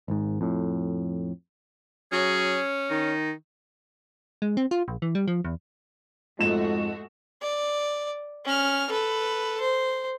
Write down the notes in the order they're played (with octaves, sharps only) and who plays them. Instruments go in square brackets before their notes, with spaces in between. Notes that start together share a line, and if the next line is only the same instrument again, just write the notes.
[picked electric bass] G#1 G#2
F2 A2
[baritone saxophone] F#3 [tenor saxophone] C#4 [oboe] G#4
[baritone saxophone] D#3 [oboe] D#4
[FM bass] G#3
C4
F4
A#1
E3
G3
F3
E2
[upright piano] F2 G#2 E7 [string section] G#3 A3 F#4
[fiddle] D5
C#4 F6
A4 B4
C5